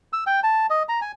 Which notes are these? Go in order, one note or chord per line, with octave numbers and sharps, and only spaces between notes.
E6
G5
A5
D#5
A#5
G#5